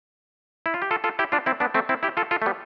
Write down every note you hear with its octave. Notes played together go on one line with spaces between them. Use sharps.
E4
F4
G4
F4 A4
F4 A4
E4 G4
D4 F4
C4 E4
B3 D4
A3 C4
C4 E4
E4 G4
F4 A4
F4 A4
A3
G3 B3